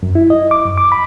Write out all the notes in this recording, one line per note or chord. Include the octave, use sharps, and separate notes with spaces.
F#2
E4
D#5
D6
F#2
D6
B5